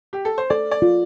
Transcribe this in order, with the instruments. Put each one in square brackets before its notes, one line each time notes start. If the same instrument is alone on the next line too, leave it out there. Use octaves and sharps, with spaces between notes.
[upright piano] G4
A4
C5
[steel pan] A4 [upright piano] D5
[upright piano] D5
[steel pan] F4